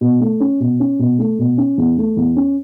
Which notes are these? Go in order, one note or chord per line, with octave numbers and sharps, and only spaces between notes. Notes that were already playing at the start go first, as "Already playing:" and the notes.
B2
A3
C#4
B2
C#4
B2
A3
B2
C#4
E2
A3
E2
C#4